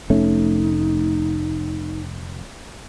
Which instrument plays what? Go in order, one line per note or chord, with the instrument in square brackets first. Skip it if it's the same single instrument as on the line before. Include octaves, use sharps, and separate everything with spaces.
[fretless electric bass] F1 A3 C#4 [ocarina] D#4